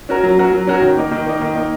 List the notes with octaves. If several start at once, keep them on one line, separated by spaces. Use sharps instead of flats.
C#4 F#4 A#4
F#3
C#4 F#4 A#4
F#3
C#4 F#4 A#4
D#3
A#3 D#4
D#3
A#3 D#4
D#3
A#3 D#4